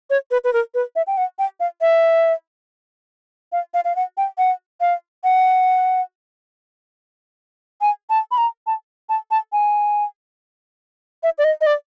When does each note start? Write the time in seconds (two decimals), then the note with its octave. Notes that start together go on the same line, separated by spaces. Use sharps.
0.10 C#5
0.31 B4
0.44 B4
0.53 A#4
0.74 B4
0.96 E5
1.07 G5
1.17 F#5
1.39 G5
1.60 F5
1.81 E5
3.52 F5
3.74 F5
3.85 F5
3.96 F#5
4.17 G5
4.38 F#5
4.81 F5
5.24 F#5
7.81 G#5
8.10 A5
8.31 B5
8.38 A#5
8.67 A5
9.09 A5
9.31 A5
9.53 G#5
11.23 E5
11.38 D5
11.44 D#5
11.61 D#5
11.66 D5